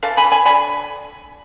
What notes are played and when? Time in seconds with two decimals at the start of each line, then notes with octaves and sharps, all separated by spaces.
0.03 E3 F5 A5
0.17 G#5 B5
0.24 E3
0.32 G#5 B5
0.45 D3 G#5 B5